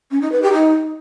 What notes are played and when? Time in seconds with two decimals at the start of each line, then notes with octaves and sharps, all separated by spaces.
0.11 C#4
0.21 D#4
0.32 B4
0.42 G4
0.53 D#4